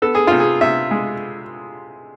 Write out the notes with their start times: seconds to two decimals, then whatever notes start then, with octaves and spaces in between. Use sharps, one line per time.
0.02 B3 A4
0.15 G#4
0.27 C3 F4
0.40 G#4
0.61 C3 E5
0.91 G#3